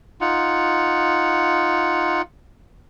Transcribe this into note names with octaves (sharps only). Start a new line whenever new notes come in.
D#4 F4 F#5